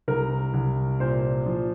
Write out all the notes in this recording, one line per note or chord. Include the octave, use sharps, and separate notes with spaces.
C2 A#4
C2
A#2 C5
F3